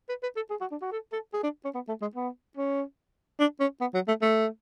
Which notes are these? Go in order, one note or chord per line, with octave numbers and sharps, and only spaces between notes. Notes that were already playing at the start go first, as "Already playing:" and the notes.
B4
B4
A4
G#4
F#4
D4
F#4
A4
A4
G#4
D4
C#4
B3
A3
G#3
B3
C#4
D4
C#4
B3
F#3
A3
A3